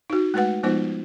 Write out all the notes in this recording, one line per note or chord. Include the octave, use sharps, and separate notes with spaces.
D#4 F#4
G#3 A3 F#4 B4 F#5
F3 G#3 B3 D#4 F4 C5